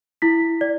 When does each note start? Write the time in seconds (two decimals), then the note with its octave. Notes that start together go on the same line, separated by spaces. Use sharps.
0.22 E4 B6
0.61 D5